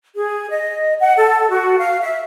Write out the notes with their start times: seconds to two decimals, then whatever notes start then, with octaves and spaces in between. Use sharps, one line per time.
0.16 G#4
0.51 D#5
1.00 F#5
1.16 A4
1.50 F#4
1.78 F5
2.03 E5